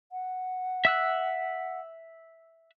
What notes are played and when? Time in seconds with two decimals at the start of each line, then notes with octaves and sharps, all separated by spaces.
0.12 F#5
0.85 E5 E6 F#6